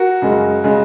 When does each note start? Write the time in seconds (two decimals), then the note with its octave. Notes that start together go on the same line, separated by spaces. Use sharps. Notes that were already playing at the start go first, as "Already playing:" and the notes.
Already playing: F#4 A#4
0.22 F#2 C#3 G#3
0.64 C#3 G#3